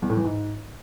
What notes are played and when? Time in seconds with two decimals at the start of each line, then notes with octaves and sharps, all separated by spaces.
0.02 E2
0.10 A2
0.17 E3
0.24 G#2